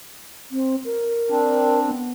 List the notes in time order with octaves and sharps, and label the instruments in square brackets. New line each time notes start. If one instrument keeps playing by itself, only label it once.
[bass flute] C4
A#4
[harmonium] C4 D4
[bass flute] B3